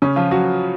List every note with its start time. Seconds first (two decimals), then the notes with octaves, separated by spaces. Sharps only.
0.02 C#3 C#4
0.16 F3 F4
0.31 F#3 F#4